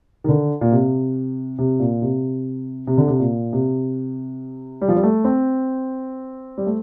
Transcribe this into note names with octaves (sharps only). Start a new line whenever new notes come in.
D#3
D3
A#2
C3
C3
A#2
C3
C3
D3
C3
A#2
C3
G3
F3
G3
A3
C4
G3
A3